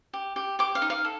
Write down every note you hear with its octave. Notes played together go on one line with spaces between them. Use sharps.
G4
G4
G4 D6
F5
D#4
F5
A4